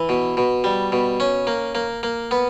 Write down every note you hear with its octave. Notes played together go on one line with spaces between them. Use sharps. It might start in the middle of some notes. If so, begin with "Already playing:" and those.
Already playing: E3
B2
B2
G3
B2
C#4
A#3
A#3
A#3
B3